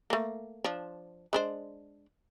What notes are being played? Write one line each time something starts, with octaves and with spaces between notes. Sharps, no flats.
A3 A#3
F3 D4
G#3 D4 C5